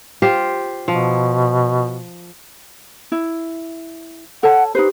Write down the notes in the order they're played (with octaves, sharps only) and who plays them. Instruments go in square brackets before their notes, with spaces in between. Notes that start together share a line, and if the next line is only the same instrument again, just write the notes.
[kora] F4 G4 C5
[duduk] B2 [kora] F3
[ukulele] E4
[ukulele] A4 C#5 A5 [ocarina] F#5
[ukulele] D#4 B4 C5 [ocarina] G4